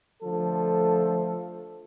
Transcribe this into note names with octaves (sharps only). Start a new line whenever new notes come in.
D3 F3 A3 A4